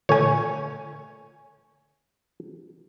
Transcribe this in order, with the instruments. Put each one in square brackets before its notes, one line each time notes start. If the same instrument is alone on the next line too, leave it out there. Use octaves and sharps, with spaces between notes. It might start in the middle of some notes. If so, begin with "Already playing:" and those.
[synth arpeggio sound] A#2 D3 A3 [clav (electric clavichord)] C#5 G#5